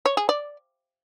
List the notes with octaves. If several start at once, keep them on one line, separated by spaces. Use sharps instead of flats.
C#5
G#4
D5